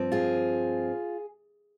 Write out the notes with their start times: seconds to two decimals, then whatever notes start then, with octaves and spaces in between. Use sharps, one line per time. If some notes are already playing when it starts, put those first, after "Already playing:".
Already playing: G2 F3 C4
0.12 F4 G#4